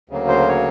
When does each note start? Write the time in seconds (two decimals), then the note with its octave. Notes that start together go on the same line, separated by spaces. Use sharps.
0.09 D2 C#3 F#3 A#3
0.28 C5
0.48 C#5